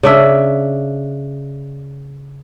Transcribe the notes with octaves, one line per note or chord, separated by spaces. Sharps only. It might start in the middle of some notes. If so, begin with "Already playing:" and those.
C#3 D4 E5